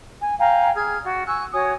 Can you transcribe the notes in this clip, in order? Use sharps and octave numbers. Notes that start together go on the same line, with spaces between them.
G#5
F5 G5 G#5 A#5
G#4 F6 G#6
F#4 D5
G#5 C#6 E6 F#6
F#4 C#5 G#5 D#6